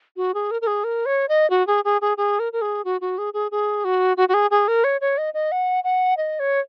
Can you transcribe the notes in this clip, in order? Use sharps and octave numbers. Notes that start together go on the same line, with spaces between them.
F#4
G#4
A#4
A#4
G#4
A#4
C#5
D#5
F#4
G#4
G#4
G#4
G#4
A#4
A#4
G#4
F#4
F#4
G#4
G#4
G#4
F#4
F#4
F#4
G#4
G#4
A#4
C#5
C#5
D#5
D#5
F#5
F#5
D#5
C#5